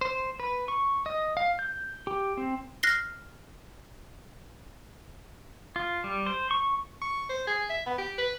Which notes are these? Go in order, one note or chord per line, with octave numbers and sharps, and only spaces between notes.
C5
B4
C#6
D#5
F5
G6
G4
C4
F6 F#6 A#6 C7 G7
F4
G3
C5
C#6
C#6
C5
G#4
E5
B3
G4
B4